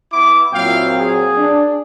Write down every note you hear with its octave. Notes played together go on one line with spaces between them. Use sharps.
B3 E4 D6
A#2 F#3 C4 E4 F5 G5
G#4
D4